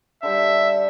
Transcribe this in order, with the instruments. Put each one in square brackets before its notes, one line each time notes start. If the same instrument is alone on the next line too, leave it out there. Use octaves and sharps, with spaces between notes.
[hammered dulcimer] D3 G3 [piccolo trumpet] E5